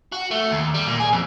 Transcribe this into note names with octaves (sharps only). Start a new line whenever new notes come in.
F#4
A3
D#2
G3
A#2
G#4
F2